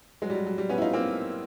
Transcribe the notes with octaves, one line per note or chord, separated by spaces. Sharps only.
F#3 G#3
G3
F#3
F#3
G3
B3 C#4
E4
D#4 F4
A#3 C4